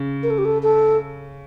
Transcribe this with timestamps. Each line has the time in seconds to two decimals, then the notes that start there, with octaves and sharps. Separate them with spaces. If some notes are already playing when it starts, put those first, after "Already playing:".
Already playing: C#3
0.23 A#4
0.30 A4
0.38 G4
0.45 A4
0.63 A4